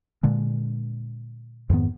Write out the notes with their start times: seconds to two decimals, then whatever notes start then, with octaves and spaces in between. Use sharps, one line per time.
0.23 A#2 D3 G#3
1.70 F2 G#2 D#3 B3